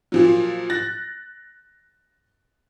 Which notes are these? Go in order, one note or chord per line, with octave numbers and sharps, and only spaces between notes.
A#2 F3 F#3
F#6 A6 A#6